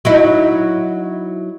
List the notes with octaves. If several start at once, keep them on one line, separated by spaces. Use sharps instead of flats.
F#3 D#4 E4